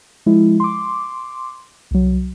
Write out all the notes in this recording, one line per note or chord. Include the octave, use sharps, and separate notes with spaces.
F3 G#3 E4
C6 D6
C2 F#3